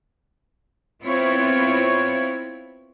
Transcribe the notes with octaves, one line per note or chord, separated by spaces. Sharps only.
B3 C4 E4 F4 B4 C#5